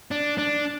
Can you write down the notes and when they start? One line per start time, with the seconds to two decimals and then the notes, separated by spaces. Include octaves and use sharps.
0.11 D4
0.38 D4